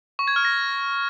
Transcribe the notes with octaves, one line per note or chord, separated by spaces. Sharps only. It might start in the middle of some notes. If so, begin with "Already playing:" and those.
C#6
G#6
F6
A#6